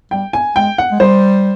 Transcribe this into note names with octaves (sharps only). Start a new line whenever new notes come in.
G3 G5
G#5
G#3 G5
F#5
G#3
G3 C5